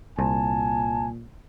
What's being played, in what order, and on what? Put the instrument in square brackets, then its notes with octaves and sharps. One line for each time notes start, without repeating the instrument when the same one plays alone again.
[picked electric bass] C2 [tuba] A#2 [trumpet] G#5 [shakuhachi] A5